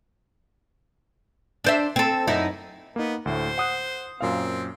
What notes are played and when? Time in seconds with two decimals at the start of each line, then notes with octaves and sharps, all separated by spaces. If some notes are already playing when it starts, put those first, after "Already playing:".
1.64 D4 C5 E5
1.96 C4 A4
2.27 F#2 D#4 E4
2.96 A#3 B3 D#4
3.26 D2 A2 A3 C5
3.58 F#5 D#6 F#6
4.21 F#2 A#2 C4 F5